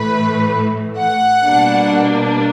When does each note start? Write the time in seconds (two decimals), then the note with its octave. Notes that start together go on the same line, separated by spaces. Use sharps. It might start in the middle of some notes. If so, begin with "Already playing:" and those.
Already playing: A2 E3 A3 B4
0.99 F#5
1.44 B2 G3 A#3 D4